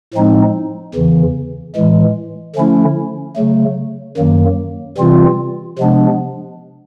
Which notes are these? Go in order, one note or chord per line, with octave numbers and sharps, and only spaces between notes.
A2 F3 G#3 C4 D#4
E2 C#3 E3
A2 E3 G#3
D3 F3 A3 C#4 E4
C#3 F#3 A3
F#2 D#3 F#3 A#3
C3 E3 G3 C4 F4
C3 F3 G#3 B3 D4